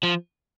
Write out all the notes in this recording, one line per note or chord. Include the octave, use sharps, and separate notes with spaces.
F3